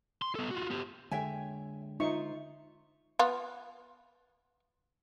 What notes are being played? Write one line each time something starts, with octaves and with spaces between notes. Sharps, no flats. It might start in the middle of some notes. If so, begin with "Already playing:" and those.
C6
B3 A4
F4 F#4
B3 G4
D3 G#3 A4 C#5 E5 G5 G#5
D#4 F4 C5 E5 C#6
B3 F4